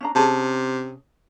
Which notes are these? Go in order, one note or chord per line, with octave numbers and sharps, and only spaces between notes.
C#4 D4 A#5
C3 C#4 G#4 A5